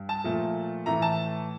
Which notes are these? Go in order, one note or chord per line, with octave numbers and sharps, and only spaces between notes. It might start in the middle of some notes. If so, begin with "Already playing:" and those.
Already playing: G2
A5
A#2 F3 A3
A2 E3 A3 A#5
A5